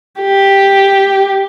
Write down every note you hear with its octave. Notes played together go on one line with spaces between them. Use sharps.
G4